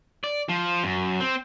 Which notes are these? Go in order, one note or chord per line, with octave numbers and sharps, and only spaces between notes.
D5
F3
F#2
C4